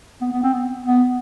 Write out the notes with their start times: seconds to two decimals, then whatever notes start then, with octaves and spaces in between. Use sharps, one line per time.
0.21 B3
0.32 B3
0.43 C4
0.54 B3
0.86 B3